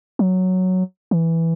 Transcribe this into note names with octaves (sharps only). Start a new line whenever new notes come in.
F#3
E3